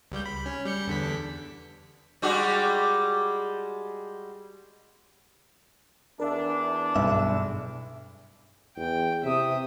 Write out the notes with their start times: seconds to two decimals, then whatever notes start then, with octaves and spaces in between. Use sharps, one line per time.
0.12 C#2 G3 G6
0.26 B5
0.46 C#4
0.65 G3 G6 C#7
0.87 E2 D3 B6
2.22 G3 G#3 F#4
6.20 E2 D4 A#4 E5
6.96 B1 G2 B2 E5
8.77 E2 G5
9.23 C3 E5 D#6